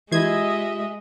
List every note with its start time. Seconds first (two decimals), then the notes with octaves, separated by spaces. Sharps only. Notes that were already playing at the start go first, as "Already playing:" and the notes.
0.12 E3 G#3 F4 G4 D#5 E5 G#6